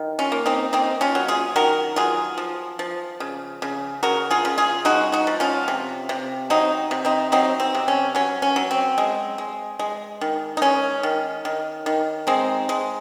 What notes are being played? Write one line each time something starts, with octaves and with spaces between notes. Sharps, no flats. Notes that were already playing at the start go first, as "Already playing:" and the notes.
Already playing: D#3
C#4 F4
A#3
C4 D#4
A#3 C4 D#4
C#4 F4
F#3
F4 G#4
D#3 F#4 A#4
F#3 F4 G#4
F3
F3
C#3
C#3
C#3 F#4 A#4
F4 G#4
C#3
F4 G#4
G#3 D#4 F#4
D#4 F#4
F3
C#4 F4
C3
C3
F#3 C4 D#4
C3
C4 D#4
F#3 C4 D#4
C4
C3
C#4
F#3 C#4
C#4
F#3
C4
G#3
G#3
G#3
D#3
D#4
G#3 C#4
D#3
D#3
D#3
G#3 C4 D#4
G#3